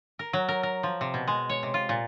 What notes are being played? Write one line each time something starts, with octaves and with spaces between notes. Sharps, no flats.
A#4
F#3
A#4
A#4
F3
C3
B2
G#3
C#5
C3
F4
A#2